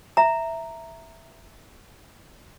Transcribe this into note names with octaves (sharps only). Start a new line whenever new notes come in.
E5 A#5